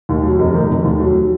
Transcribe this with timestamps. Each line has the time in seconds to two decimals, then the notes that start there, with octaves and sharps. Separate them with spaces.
0.09 D#2
0.23 F#3
0.39 F1
0.54 D#3
0.69 F1
0.84 D#2
0.99 F#3
1.15 F#3